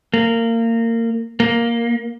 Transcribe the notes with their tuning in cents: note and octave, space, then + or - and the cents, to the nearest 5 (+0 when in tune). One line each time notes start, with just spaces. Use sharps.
A#3 -25
A#3 +0